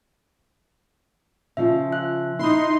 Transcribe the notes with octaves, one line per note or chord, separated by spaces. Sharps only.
C#3 F3 F4 E5
E5 F#6
D#4 E4 C6